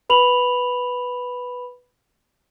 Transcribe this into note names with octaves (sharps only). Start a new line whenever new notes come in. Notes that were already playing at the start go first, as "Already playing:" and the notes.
B4 B5 F7 F#7